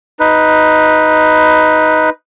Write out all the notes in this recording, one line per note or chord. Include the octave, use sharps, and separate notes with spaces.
D#4 B4